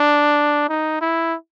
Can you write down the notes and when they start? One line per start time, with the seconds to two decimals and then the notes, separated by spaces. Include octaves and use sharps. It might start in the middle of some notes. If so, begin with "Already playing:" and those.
Already playing: D4
0.69 D#4
1.01 E4